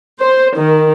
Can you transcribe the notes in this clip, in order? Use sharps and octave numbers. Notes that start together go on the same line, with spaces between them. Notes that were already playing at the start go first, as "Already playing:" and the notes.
C5
D#3